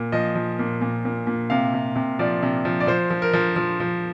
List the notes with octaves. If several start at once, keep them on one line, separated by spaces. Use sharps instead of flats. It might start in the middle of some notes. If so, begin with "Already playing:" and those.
Already playing: A#2
F3 D#5
F3
A#2
A#2
A#2
A#2
C3 F5
C3
C3
F3 D5
C3
F3
D5
F3 C5
F3
A#4
F3
F3
F3